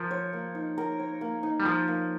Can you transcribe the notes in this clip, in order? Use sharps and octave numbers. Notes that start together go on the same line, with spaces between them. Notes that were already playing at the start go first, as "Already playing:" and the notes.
Already playing: F3 A#4
C#5
A#3
D#4
A#4
C#5
A#3
D#4
G3
F3 A#4
A#3